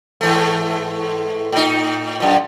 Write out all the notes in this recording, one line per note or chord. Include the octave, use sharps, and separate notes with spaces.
G#2 E3 A3
A2 D#4
F#2 A#2